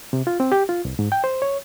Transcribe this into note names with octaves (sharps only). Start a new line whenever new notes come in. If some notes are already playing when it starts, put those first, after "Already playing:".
C3
F4
C4
G4
F4
C2
G#2
G5
C5
C#5